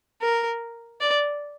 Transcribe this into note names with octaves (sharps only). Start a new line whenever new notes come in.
A#4
D5